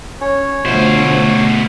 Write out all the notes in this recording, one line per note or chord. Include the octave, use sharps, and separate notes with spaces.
C#4 C#5
D2 B2 F3 C5